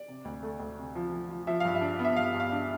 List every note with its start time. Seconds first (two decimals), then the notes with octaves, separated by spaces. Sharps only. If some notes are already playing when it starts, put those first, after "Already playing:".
Already playing: D5
0.08 C3
0.25 D2
0.43 A3
0.60 D2
0.77 C3
0.95 F3
1.12 F3
1.30 F3
1.47 F3 E5
1.60 G2 F5
1.75 E5
1.81 D4
1.99 B3
2.05 E5
2.16 G2 F5
2.34 G2
2.40 F5
2.52 D4